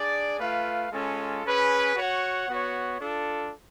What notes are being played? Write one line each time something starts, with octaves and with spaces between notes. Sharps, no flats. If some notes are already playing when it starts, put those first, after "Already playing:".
Already playing: D4 G#4 D5
A3 F4 B4 F5
G#3 C#4 F4 A4
C#4 G#4 B4
F#4 C#5 F#5
B3 F#4 C#5
D4 F4 A4